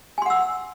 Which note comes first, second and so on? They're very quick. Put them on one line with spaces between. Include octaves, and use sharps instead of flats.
G#5 C6 F#5 E6